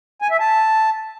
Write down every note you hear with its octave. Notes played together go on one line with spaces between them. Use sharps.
G#5
E5
A5